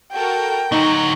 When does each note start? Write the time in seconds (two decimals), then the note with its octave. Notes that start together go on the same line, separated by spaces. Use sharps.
0.13 F#4 A4 A#4 G5
0.72 D2 F#3 D#4 C#6